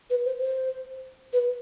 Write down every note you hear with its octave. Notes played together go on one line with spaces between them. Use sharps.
B4
C5
C5
B4